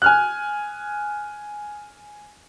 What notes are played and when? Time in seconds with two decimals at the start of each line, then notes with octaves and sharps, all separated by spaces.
0.02 G#5 F6 F#6